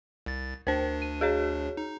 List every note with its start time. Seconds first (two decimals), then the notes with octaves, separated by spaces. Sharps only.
0.26 C2 A6
0.67 D2 D4 A#4 C5
1.02 D#7
1.21 F#4 G#4 C#5
1.77 D#4